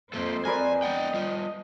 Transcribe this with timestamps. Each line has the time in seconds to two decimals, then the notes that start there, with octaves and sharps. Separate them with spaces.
0.13 F2 A#3 C4 A4 C5
0.45 A#4 B4 D5 G#5
0.82 B3 D#5 F#5 G5
1.14 G3 F4